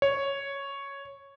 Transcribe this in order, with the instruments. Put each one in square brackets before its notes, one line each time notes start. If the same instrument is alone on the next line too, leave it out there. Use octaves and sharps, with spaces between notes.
[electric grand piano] C#5